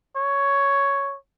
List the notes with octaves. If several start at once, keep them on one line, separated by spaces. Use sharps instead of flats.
C#5